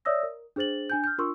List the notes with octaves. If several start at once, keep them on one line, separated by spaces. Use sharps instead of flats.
C#5 D5 E5 D#6 E6 A#6
A#4
D4 G#4 C5 A6 F#7
D4 G#5 G6
F6 G6
D4 F4 A#4 C6 C#6 E6